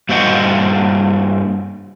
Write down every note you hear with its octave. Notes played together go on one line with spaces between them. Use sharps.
G2 A#3 F#4 C5 D#5 F#5